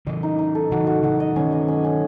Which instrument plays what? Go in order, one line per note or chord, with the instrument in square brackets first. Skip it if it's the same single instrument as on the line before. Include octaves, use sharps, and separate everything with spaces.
[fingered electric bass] C#3 E3 [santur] D#5
[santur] D#4
D#4
A4
[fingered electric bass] C#3 E3 [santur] F#4
[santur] F#4
[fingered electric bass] C#3 E3 [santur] F#4
[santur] D#5
[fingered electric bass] D#3 F#3 [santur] C#4
[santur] D#5
C#4
C#4